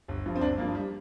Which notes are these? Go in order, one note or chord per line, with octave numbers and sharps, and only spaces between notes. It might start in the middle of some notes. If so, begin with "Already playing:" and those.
G1
G2 F3
C4
G1 D4
G2 F3 A#3
G3